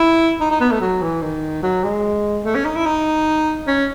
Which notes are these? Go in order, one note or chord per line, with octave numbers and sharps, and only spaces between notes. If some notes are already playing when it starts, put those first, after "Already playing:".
Already playing: E4
D#4
D#4
B3
A3
F#3
E3
D#3
F#3
G#3
A3
C#4
D#4
E4
D#4
C#4